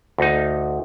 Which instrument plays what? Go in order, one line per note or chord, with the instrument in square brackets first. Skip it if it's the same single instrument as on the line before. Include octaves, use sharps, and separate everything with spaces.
[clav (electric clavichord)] D2 D#4